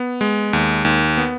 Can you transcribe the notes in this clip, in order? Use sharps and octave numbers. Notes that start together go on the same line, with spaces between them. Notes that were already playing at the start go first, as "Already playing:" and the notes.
Already playing: B3
G#3
D#2
D#2
B3